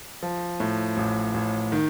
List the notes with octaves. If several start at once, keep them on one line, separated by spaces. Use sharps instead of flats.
F3
A2
A1
A1
D#3